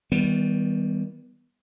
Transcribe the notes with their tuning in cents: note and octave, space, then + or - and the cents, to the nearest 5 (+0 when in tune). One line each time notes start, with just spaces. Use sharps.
D#3 +35 G3 +5 B3 +0